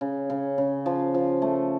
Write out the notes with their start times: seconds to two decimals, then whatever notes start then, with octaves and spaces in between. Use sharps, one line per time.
0.01 C#3
0.30 C#3
0.58 C#3
0.86 F3
1.14 F3
1.42 A3